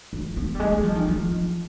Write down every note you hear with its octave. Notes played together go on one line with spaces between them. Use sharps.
F3
B3
G3
G#3
G3
F3
D#3
F3